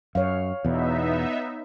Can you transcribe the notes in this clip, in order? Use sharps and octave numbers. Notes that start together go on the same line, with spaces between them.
F#2 C#5 F5
E2 B2 B3 D#4 E5